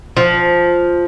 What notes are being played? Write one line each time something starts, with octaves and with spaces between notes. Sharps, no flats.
F3